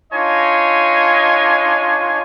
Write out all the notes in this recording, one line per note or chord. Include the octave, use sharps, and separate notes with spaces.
D4 D#4 F4 C#5 D#5 G#5